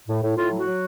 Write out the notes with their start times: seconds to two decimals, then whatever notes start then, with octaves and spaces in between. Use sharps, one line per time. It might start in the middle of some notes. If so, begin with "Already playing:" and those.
0.08 A2
0.23 A2
0.37 A2 F4
0.52 F#3
0.58 F#4
0.66 F#3